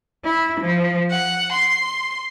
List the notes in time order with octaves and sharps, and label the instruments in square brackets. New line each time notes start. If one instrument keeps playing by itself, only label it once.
[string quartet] E4
F3
F#5
C6